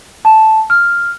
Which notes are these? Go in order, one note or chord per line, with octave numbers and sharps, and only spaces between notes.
A5
F6